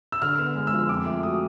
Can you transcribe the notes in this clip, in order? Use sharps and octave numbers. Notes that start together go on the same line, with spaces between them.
E6
D3 F6
B3
G#3
E6
F3
F2 D6
A3
F#3 D#6